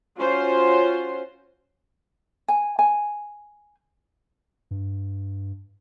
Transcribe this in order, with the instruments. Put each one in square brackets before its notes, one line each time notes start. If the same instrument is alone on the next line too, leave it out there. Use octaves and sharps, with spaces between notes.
[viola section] C#4 F4 F#4 C5 C6
[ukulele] G#5
G#5
[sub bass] G2